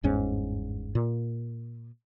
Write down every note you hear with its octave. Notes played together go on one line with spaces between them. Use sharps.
G1 E2 G#2 C#4
A#2